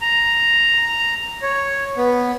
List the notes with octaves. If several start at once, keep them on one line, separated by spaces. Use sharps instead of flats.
A#5
C#5
B3